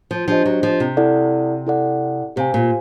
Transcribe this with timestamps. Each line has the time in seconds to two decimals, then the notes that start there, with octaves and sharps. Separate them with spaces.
0.11 F3
0.28 F3 D4 G4 C5 D#5
0.46 F#3
0.63 F3
0.80 C3
0.97 E4 A4 D5 F#5
1.67 E4 A4 D5 F#5
2.36 C3 G4 C5 F5 G#5
2.54 A#2